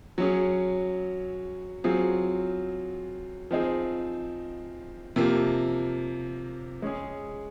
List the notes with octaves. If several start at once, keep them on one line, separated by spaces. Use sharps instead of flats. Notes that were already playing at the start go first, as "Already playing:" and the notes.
F#3 C#4 G#4
F#3 C4 F4 G#4
F3 C4 D#4 G#4
C3 F3 A#3
G#3 C#4 G#4